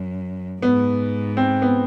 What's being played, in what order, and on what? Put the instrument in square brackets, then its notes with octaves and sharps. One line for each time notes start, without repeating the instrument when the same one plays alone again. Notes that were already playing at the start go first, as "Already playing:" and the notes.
Already playing: [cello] F#2
[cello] G#2 [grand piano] B3
[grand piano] C4
B3